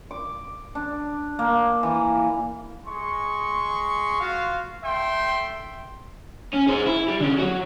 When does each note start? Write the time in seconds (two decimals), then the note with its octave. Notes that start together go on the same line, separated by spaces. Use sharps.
0.11 D6
0.75 D4
1.39 A#3
1.83 E3
2.87 G#3 C6 C#6
4.20 F4 F#4 F5
4.83 A3 E5 G5 C6
6.53 C#4
6.68 G#4 C5
6.86 E4
7.08 G3 G4
7.20 D3 C#4
7.39 F#3 F#4